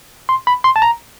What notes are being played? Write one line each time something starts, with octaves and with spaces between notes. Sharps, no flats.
C6
B5
C6
A5
A#5